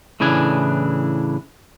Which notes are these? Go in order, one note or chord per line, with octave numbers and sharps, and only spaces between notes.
A2 C#3 E3 D4 G#5